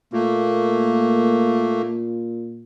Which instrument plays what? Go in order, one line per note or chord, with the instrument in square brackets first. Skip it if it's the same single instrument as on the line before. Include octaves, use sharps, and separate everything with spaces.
[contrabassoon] A#2 [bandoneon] A3 A#3